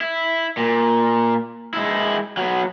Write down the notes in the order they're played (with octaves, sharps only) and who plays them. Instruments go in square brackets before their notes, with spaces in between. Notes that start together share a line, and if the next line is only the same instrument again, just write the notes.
[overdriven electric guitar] E4
A#2
G#3 E4
F#3 B3